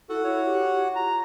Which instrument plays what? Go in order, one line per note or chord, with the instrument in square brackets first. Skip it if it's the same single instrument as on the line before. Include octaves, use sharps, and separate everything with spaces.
[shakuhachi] E4 [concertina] F#4 F#5 [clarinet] A4
[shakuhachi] E4 [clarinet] C#5
[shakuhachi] G4
[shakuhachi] F4 [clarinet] A#5